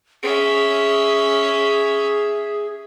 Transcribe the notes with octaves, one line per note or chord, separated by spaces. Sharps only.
C#4 G#4 E5